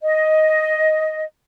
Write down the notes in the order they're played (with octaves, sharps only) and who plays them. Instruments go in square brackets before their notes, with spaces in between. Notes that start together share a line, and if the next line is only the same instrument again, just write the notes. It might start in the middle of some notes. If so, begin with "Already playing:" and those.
[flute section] D#5